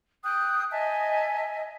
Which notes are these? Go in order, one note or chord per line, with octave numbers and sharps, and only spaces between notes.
G5 D#6 F#6
D#5 E5 G#5 A5